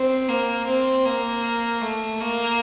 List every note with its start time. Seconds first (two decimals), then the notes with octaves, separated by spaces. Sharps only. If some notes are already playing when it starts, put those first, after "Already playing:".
Already playing: C4
0.29 A#3
0.67 C4
1.06 A#3
1.82 A3
2.20 A#3